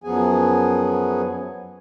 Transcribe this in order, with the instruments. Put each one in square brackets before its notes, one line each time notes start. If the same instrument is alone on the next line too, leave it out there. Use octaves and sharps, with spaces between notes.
[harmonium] F#2 F3 F#3 B3 G#4 G#5